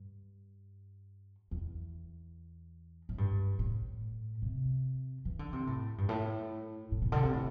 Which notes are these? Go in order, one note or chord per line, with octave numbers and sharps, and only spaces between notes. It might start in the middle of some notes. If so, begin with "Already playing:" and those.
Already playing: G2
E2
A2
G2
A2
C3
E3
D3
C3
A2
G2
A2
A2
C3
D3
C3
A2